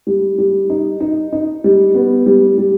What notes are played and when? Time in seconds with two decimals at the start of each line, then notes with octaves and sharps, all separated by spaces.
0.07 G3
0.38 G3
0.70 D#4
1.00 D#4
1.33 D#4
1.64 G3
1.95 B3
2.26 G3
2.58 G3